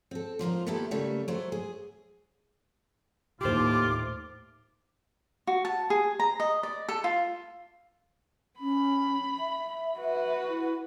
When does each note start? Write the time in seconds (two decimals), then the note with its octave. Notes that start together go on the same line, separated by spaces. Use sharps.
0.11 C4 A4
0.39 G#2 F3 F4 A#4
0.67 A#2 D#3 B3 E4 G4 A4
0.91 C#3 G3 A3 A#3
1.28 F#3 A3 C5
1.52 G#4
3.41 D#2 A2 F4 G4 C5 D6
5.47 F#4
5.65 A5
5.90 G#4
6.20 A#5
6.40 D#5
6.63 D5
6.89 A4
7.04 F4
8.60 C#4 B5
9.39 E5
9.98 F#4 B4
10.48 E4